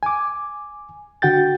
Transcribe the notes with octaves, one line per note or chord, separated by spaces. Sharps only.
G#5 D6
D3 F#4 F#5 G5 G6 A6